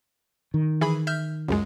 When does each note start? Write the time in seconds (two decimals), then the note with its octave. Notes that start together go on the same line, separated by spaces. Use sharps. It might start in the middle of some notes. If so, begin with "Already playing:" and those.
0.54 D#3
0.81 E3 G#4 B5
1.07 E5 F6 G6
1.48 C#2 F#2 G#3